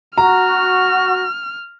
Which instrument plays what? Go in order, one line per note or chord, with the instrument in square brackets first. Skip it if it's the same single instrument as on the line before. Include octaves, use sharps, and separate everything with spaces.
[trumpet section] F#4 [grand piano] A#5 [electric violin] F6